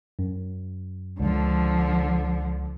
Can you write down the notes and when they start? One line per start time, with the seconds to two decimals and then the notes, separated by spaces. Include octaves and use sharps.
0.19 F#2
1.20 C#2 D3 F3